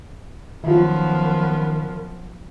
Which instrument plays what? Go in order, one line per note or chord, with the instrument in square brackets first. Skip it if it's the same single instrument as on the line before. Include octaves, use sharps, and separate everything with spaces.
[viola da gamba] F#2 F3 B3 [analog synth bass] D#3 [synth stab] E4 F4 [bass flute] A#4